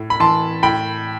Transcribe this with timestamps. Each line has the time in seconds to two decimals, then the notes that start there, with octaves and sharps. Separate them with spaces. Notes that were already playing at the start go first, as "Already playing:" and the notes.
Already playing: A2
0.10 B5
0.20 E3 A5 C6
0.63 A2 G5 B5